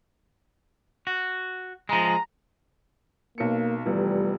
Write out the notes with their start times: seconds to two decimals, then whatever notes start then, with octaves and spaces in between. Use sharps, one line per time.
1.07 F#4
1.89 F3 G#3 A#5
3.38 B1 A#3 C#7
3.85 F1 E2 F3 G3